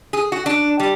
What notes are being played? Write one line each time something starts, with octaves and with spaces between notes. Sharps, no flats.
G#4
F#4
D4
G3